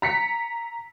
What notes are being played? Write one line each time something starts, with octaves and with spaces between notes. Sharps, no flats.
A#5 B6 C#7